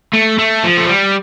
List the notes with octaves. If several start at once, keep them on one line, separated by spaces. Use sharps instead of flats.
A3
A3
F3
A3
G3